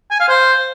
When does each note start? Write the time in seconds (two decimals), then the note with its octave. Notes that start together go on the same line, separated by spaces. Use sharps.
0.11 G#5
0.20 F5
0.29 C5